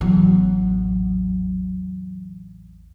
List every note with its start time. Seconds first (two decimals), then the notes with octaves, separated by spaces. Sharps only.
0.01 A1 E2 F#3